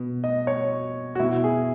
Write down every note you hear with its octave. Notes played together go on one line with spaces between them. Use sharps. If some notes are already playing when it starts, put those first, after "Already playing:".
Already playing: B2
D#5
C#5
F#4
B2 E4
G#4